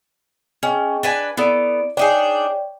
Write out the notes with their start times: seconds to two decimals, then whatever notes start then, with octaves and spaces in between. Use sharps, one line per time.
0.63 C#4 G#4 D#5 G5
1.03 D4 B4 G#5
1.37 B3 E4 A4 D5 D7
1.97 D4 D#4 G#4 C#5 D5 G5